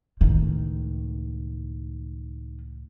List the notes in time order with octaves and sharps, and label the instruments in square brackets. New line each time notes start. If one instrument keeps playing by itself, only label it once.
[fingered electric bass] C#2 A2 [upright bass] D#3